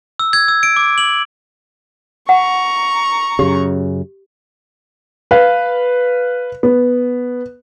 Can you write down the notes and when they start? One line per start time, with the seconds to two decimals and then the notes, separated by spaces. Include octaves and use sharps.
0.19 E6
0.33 G#6
0.48 E6
0.63 D7
0.76 D6
0.98 F#7
2.29 F#5 A#5 C#6
3.39 F#2 C#3 G4
5.31 B4 F5
6.63 B3